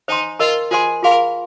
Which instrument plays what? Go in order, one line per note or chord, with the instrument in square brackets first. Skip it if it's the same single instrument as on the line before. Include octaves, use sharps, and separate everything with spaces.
[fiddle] D#4 [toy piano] C5 G#5 C6
[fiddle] F4 [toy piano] A#4 D#5 A#5
[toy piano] F4 C5 G#5 C6 [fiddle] G#4
[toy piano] F4 G#4 F5 C6 [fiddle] A#4